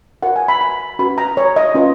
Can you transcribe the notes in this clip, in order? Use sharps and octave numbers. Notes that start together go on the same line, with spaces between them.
F#4 A#4 C#5 F#5
G#5
B5
B5
C#4 F#4 B4 B5
A#5
C#5
D#5
C#4 F4 B4